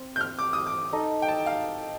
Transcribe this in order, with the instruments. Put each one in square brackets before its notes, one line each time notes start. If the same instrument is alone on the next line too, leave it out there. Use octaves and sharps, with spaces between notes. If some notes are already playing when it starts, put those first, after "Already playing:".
Already playing: [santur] C4 C5
[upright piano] G6
F6
D6
D#6
D6
[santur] D#4 A4 D#5
[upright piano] G5
A5
F5